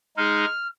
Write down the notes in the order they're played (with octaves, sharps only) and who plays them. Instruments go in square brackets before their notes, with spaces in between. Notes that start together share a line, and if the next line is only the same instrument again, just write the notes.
[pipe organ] G#3 D#4 G#4 [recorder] F6